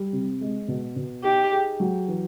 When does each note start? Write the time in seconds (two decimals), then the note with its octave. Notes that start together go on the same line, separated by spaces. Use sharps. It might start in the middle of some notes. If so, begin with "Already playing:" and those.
Already playing: G3
0.13 C3
0.41 G#3
0.68 B2
0.96 B2
1.24 D#4 G4
1.51 G#4
1.80 F#3
2.08 E3